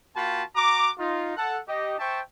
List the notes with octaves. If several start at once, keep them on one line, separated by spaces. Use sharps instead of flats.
A#3 F4 F#4 G5 A5 B5
F#4 A#5 D6
D#4 F4
A4 F#5 A5
D#4 G4 D#5
C5 E5 G5 A5 C#6